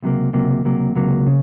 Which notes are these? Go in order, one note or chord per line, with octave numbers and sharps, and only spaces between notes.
C#2 C3 F#3 A#3
C#2 C3 F#3 A#3
C#2 C3 F#3 A#3
C#2 C3 F#3 A#3
C#3